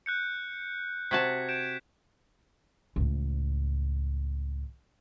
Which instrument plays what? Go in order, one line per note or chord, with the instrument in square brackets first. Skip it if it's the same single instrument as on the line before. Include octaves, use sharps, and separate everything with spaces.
[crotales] F#6 G6 C#7
[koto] C3 F#4 A5 [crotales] G#6 B6
[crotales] G6 D7 E7
[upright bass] C#2 A2